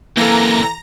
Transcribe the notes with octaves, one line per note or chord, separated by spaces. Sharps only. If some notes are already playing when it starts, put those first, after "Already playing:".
F#2 C3 E3 A#3 A4 A#5 A#6